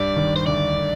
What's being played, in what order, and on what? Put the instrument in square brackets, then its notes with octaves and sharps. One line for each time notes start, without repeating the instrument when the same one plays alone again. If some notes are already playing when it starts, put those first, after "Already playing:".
Already playing: [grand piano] G2 G3 [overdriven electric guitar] D5
[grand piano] D#2 D#3
[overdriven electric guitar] C5
[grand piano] D2 D3 [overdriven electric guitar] D5
[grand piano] D3